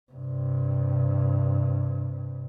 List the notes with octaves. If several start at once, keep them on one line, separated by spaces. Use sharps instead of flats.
G2 C3